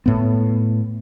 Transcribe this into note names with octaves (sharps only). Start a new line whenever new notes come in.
A2 B3